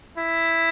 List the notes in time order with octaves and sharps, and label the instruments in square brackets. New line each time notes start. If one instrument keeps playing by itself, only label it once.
[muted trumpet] E4